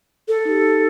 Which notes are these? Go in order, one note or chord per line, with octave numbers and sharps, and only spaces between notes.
A4
D#4 G4